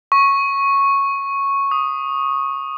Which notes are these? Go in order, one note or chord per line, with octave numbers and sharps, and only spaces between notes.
C#6
D#6